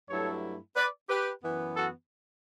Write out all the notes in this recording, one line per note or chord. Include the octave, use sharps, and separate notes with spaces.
G2 F#3 A3 E4 A4 C#5
B4 D5
G4 B4
F#2 E3 B3
F#4 A4